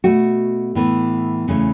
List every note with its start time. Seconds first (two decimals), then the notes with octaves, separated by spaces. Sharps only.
0.04 B2 A3 F#4
0.75 A2 E3 B3
1.47 E2 C#3 E3 A3